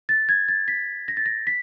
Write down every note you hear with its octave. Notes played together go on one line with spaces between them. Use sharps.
A6
G#6
A6
B6
A#6
A6
A#6
B6